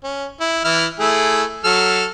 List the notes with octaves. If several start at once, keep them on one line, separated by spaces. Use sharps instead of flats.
C#4
E4
E3 E4 F6
A3 E4 G#4
F#3 A4 F6